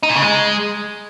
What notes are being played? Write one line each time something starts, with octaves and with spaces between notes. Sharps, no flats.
D#4
A#2
C#3
G#3